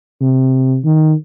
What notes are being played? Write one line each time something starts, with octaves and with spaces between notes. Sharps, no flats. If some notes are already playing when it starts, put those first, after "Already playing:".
C3
D#3